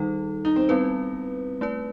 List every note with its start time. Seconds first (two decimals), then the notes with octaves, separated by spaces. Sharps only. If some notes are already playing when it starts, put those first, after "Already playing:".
Already playing: D#3 G3 D#4 A4
0.45 D#4
0.56 C4
0.69 G3 B3 C4 E4 B4
1.61 A3 E4 B4